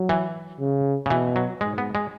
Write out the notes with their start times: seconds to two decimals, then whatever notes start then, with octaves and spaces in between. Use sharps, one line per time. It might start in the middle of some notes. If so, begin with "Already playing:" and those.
Already playing: F#3
0.09 E3
0.60 C#3
1.06 C#3
1.10 B2 E3
1.36 F#3
1.61 G#2 G#3
1.78 B3
1.95 G#3